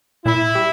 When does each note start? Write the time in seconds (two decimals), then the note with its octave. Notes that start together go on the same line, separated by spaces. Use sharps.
0.25 A#2 E4
0.55 G3